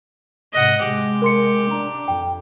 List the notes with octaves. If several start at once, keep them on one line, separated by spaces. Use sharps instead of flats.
G#2 C3 D#5 F#5
C3 G#3 G4
A#4 C6 C#7
D4 A#5
F2 G5